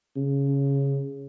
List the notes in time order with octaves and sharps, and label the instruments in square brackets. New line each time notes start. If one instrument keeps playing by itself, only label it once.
[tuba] C#3